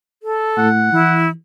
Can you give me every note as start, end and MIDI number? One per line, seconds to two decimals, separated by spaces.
0.23 0.69 69
0.58 0.88 45
0.58 1.23 78
0.92 1.31 52
0.92 1.29 64